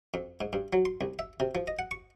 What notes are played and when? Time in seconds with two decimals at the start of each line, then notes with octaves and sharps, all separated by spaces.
0.14 F2
0.41 G#2
0.53 G2
0.73 F#3
0.85 C6
1.01 C2
1.19 E5
1.40 C3
1.55 F3
1.67 D#5
1.79 F#5
1.91 C#6